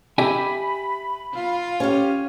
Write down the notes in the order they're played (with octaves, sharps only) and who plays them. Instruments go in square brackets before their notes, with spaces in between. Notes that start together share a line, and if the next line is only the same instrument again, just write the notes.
[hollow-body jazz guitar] G4 E5 G#5 [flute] B5
[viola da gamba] F4
[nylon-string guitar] C#4 F5 [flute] G4